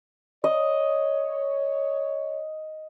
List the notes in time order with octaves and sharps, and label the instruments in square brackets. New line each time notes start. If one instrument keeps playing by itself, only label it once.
[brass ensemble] C#5 [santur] D#5